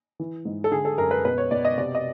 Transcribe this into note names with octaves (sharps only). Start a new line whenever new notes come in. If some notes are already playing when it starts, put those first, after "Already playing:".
E3
G#2
A4
D3 G#4
A4
F#2 A#4
B4
B2 B4
C#5
B2 D5
D#5
C3 D5
D#5